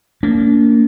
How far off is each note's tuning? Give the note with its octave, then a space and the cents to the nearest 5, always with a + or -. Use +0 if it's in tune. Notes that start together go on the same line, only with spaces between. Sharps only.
A#3 -20 D4 -40